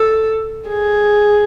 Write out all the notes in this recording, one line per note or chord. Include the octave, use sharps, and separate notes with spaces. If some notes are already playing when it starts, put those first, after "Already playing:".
Already playing: A4
G#4